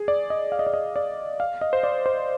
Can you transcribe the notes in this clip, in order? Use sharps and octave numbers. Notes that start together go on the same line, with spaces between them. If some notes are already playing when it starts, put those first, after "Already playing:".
Already playing: G#4
D5
D#5
F5
D#5
D5
D#5
D5
F5
D#5
C5
D5
C5